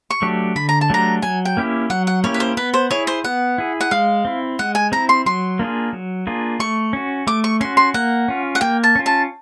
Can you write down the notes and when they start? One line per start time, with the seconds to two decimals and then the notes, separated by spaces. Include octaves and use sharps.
0.10 C#6
0.22 F#3 A3 D4 G4
0.55 D3 B5
0.69 A#5
0.81 A5
0.90 F#3 A3 D4 G4 A#5
1.22 F#3 G#5
1.45 G5
1.57 A#3 C#4 E4 G4
1.90 F#3 F#5
2.07 F#5
2.24 A#3 C#4 E4 G4 C#5
2.34 B4
2.40 C5
2.57 B3 B4
2.74 C5
2.91 E4 G#4 C#5
3.07 C5
3.24 B3 F#5
3.58 E4 G#4
3.81 F#5
3.91 G#3 F5
4.25 C4 E4
4.59 G#3 F#5
4.75 G#5
4.92 C4 E4 A#5
5.09 C6
5.26 F#3 C6
5.59 A#3 D4 F4 G#4
5.93 F#3
6.27 A#3 D4 F4 G#4
6.59 A3 C#6
6.93 C#4 F#4
7.27 A3 D6
7.44 C#6
7.61 C#4 F#4 C6
7.77 C6
7.94 A#3 F#5
8.28 C#4 F4
8.55 F#5
8.61 A#3 G5
8.83 A5
8.95 C#4 F4
9.06 A5